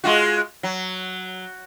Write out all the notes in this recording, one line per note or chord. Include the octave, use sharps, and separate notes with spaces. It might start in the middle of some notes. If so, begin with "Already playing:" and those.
G#3 F4 F#4
F#3